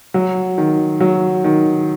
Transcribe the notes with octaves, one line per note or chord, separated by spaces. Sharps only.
F#3
D#3
F#3
D#3